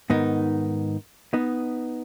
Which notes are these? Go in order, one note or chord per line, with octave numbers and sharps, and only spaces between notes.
G#2 D#3 B3 D#4
B3 D#4